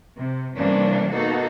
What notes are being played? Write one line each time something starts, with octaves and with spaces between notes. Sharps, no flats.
C3
C3 E3 G3 A#3 C#4 D4
A#3 B3 D#4 F#4 A4